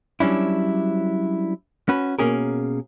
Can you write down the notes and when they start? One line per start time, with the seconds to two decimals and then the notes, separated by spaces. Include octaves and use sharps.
0.20 F#3 G3 C#4 D4 E4
1.89 C#4 F#4 B4
2.19 B2 A#3 C#4 G#4 A#4